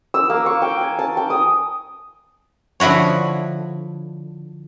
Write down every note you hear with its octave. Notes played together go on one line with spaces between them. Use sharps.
E6
A#3
C#6
G5
G#5
A5
G5
D#6
D3 F3 E4 F#4 C#5